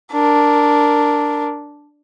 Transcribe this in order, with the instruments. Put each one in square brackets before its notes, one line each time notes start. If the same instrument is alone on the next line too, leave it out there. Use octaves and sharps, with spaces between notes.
[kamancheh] D4 A#4